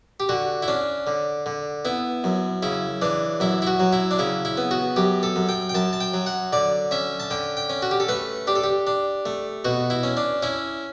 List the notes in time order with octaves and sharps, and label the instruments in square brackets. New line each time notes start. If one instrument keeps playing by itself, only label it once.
[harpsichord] G4
D3 F#4
E4
C#4 D4
D3
D3
B3 E4
F#2
C#3 E4
E3 D4
F#2 E4
E4
F#4
F#3
E4
D4
C#3 E4
E4
B3
F#4
F#2 G4
A4
F#2
G5
G5
F#2 A5
A5
G5
F#3
F#5
D3 D5
C#4 E5
A5
D3 G5
G5
C#4
F#4
G4
A4
A3 B4
D4 G4
A4
G4
D4
A3
B2 F#4
E4
C#4
D4
C#4 E4